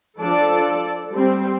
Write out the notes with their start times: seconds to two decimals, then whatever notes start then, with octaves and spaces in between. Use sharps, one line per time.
0.20 F3 D4 A4 D5
1.14 G3 C4